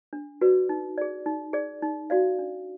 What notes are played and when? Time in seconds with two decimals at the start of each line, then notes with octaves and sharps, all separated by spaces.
0.13 D4
0.41 F#4 B4 D5
0.69 D#4
0.98 G#4 D5
1.26 D#4
1.53 G#4 D5
1.82 D#4
2.10 F#4 D5 F5
2.39 D4